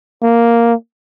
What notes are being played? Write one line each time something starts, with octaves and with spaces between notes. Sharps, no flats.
A#3